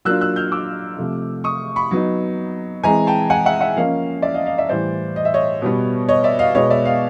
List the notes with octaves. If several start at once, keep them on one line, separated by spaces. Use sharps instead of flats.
F#3 A#3 D4 F4 E6 F#6
E6 F#6
F6 G6
D6 E6
C3 F3 A3
C#6 D#6
B5 C#6
F#3 B3 D#4
E3 G#3 C4 G#5 A#5
G5 A5
F#5 G#5
E5 F#5
E5 F#5
F3 A#3 C#4 D#5 F5
D5 E5
D#5 F5
D#5 F5
D5 E5
A2 E3 G3 C5 D5
D#5
E5
C#5 D#5
B2 G3 B3
C#5 D#5
D5 E5
D#5 F5
B2 G#3 B3 C#5 D#5
D5 E5
D#5 F5